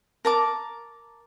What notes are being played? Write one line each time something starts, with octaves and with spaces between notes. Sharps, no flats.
A#4 A5 D6